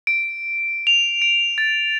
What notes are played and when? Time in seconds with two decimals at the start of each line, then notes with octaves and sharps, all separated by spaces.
0.07 D7
0.87 F7
1.22 D7
1.58 A6